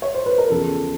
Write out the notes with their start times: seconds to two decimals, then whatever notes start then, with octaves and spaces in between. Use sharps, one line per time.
0.02 C#5
0.15 C5
0.26 B4
0.38 A#4
0.50 E2 C#3 F3 A4